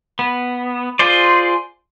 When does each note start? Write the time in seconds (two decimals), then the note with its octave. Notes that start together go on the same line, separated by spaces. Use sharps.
0.19 B3
0.99 F4 G#4 C5 D5